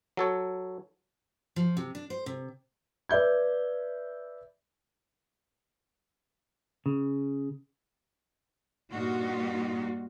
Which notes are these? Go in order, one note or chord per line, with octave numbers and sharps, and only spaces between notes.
F#3 A4 C#5
F3
C3
D4
C5
C3
B4 D5 E5 G6 G#6
C#3
G2 A#2 D#4 F4 F#4